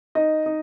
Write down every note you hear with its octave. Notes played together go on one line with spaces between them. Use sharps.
D#4 D#5
D#4